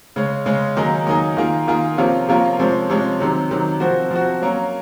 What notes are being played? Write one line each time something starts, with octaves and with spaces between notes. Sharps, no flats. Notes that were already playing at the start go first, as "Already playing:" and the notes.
C#3 G#3 C#4
C#3 G#3 C#4
D#3 F#3 A#3 D#4 G#4
D#3 F#3 A#3 D#4 G#4
D#3 A#3 F4 G#4
D#3 A#3 F4 G#4
C3 F3 A#3 C#4 F4
C3 F3 A#3 C#4 F4
C3 F3 G#3 C#4
C3 F3 G#3 C#4
C3 D#3 F#3
C3 D#3 F#3
F3 C4 F#4
F3 C4 F#4
F#3 A#3 C#4